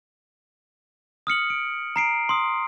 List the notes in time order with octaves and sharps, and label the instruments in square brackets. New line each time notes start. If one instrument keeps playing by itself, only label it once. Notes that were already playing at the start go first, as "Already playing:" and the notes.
[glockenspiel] D#6 F6 C#7 F#7
D7
A#5 C7 D7
C6 D#6